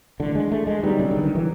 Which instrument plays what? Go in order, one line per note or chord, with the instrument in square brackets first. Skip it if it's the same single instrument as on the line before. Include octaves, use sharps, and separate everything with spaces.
[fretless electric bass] D3 [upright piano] E3 A3 D4
[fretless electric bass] G#3
A3
G#3
[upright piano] D#3 F#3 B3 D#4 [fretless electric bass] G3
[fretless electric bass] C#3
D3
D#3
E3